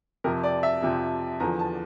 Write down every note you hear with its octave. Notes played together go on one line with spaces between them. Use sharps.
F2 C3 F3 A#4
D5
E5
F2 C3 F3
E2 D3 F3 A#5
A5